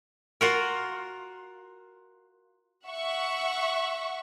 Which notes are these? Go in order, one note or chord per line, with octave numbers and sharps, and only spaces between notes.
F4 F#4 A#4
E5 F#5 C#6